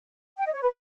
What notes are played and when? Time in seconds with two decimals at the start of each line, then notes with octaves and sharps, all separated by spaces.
0.38 G5
0.46 D#5
0.54 C#5
0.62 B4